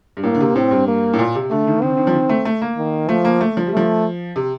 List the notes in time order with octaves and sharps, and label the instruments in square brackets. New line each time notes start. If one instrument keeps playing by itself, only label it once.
[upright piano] G2
[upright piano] A2 [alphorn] A#3
[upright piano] D3
C3
[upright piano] A2 [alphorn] C4
[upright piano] G2
[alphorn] A#3
[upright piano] A2
A#2
C3
[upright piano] D3 [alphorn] A3
[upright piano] D#3
[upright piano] D#3 [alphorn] C4
[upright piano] D3
D#3
F3
D#3
A3
A3
A#3
[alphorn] D#3
[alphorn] F3 [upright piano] A3
[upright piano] A#3
A3
F3
G3
[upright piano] F3 [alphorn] A3
[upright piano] C3